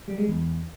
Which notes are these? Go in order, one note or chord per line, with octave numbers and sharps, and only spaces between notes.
G3
G#3
E2